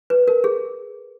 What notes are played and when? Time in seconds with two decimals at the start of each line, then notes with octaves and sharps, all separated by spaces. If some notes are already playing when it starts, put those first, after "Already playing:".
0.10 B4
0.28 A#4
0.44 G#4